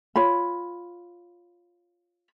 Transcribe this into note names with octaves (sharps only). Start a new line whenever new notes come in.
F4 C#5 B5